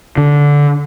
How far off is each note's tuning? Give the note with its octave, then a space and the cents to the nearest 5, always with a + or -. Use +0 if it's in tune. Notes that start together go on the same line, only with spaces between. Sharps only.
D3 -15